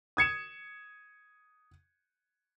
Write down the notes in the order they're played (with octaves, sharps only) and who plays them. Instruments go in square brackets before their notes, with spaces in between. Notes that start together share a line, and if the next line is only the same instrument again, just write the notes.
[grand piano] D#6 G#6 C#7 E7